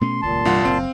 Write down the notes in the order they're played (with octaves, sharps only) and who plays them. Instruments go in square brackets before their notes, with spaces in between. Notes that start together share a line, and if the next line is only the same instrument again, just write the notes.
[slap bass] B2 A3 C#4 [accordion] C6
[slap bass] D#1 C#2 [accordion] A#2 A5 C6
[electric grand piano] C2 F4 F#5 [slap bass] G2 E3 A#3
[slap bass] F#1 [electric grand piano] C4 F5